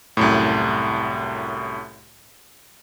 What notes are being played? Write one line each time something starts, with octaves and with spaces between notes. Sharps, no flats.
C2 F#2 A2